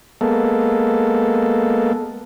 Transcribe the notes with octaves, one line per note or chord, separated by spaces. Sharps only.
G#3 A#3 B3 A4